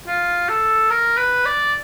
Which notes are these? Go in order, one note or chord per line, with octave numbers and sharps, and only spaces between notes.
F4
A4
A#4
B4
D5